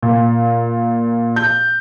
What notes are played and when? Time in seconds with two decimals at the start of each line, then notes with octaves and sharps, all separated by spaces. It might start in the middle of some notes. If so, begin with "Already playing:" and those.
0.03 A#2
1.36 G6